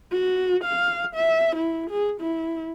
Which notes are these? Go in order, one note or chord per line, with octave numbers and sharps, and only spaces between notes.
F#4
F5
E5
E4
G#4
E4